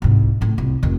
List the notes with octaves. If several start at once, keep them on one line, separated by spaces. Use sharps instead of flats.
C2 G#2
A2 C#3
C2
F1 D#3